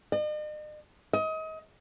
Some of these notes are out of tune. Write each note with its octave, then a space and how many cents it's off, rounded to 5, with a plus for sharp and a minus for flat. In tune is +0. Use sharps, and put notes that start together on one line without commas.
D#5 -45
D#5 +30